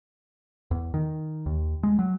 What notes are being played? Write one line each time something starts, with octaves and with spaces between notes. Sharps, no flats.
E2
D#3
D#2
G#3
F#3